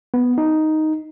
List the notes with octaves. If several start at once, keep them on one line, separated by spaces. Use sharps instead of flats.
B3
D#4